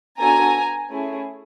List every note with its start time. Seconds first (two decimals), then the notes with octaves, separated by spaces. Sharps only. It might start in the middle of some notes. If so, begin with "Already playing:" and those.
0.19 B3 D4 F#4 A4 G#5 A#5
0.91 A3 C#4 E4 G#4